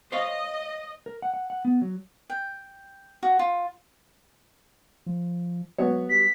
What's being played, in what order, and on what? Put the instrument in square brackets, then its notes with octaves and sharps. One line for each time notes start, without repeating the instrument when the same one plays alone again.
[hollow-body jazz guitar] C5 C#5 F5 [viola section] D#5
[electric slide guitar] A#4
F#5
F#5
F#5
B3
F#3
[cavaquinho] G5
F#4
F4
[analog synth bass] F3
[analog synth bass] F#3 [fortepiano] B3 F#4 C#5
[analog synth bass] G3 [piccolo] B6